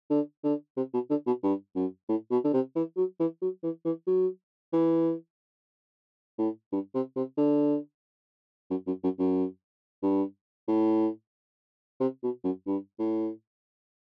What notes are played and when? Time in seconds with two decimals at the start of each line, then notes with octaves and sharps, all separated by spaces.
0.10 D3
0.44 D3
0.77 C3
0.94 B2
1.10 D3
1.27 B2
1.43 G2
1.76 F#2
2.09 A2
2.31 B2
2.44 D3
2.53 C3
2.76 E3
2.97 F#3
3.20 E3
3.42 F#3
3.63 E3
3.85 E3
4.07 F#3
4.73 E3
6.38 A2
6.72 G2
6.94 C3
7.16 C3
7.37 D3
8.70 F#2
8.87 F#2
9.04 F#2
9.19 F#2
10.03 G2
10.68 A2
12.00 C3
12.23 B2
12.44 F#2
12.67 G2
12.99 A2